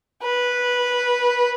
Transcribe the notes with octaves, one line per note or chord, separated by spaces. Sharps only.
B4